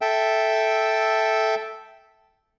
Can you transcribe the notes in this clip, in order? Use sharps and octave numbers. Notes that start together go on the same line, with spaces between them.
A4 E5 G5